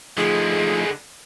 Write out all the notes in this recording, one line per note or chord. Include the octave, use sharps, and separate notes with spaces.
D3 F3 G#3 A3 D#4 G#4